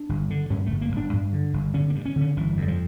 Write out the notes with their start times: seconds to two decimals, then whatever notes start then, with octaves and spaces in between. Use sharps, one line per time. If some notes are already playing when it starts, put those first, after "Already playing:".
Already playing: D4
0.09 G1
0.30 D3
0.50 G2 C#4
0.66 G1 A3
0.81 A#3
0.92 G1
0.97 D4
1.13 G2
1.33 D3
1.53 G1
1.74 D3 C#4
1.90 A#3
1.95 G2
2.05 C#4
2.16 D3
2.21 C#4
2.37 G1 E3
2.57 F2
2.62 G3
2.68 F3